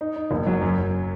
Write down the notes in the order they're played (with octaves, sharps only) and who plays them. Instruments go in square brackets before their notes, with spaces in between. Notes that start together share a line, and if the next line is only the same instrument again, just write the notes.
[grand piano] D#4
D#4
F#1
F#3
F#2
F#2